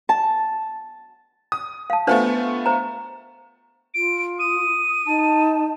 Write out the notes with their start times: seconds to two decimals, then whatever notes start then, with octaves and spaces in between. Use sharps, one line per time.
0.09 A5
1.52 D#6
1.90 F5 A5
2.07 A3 B3 D4 F4 C5
2.66 C5 A#5
3.94 F4 D7
4.39 D#6 D#7
5.06 D#4 A5